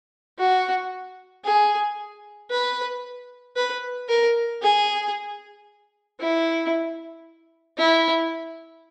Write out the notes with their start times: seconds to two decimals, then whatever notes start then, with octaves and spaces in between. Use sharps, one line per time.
0.39 F#4
1.44 G#4
2.51 B4
3.56 B4
4.09 A#4
4.62 G#4
6.20 E4
7.78 E4